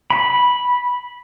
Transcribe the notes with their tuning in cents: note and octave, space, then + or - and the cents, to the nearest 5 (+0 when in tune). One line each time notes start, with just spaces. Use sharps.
B5 -10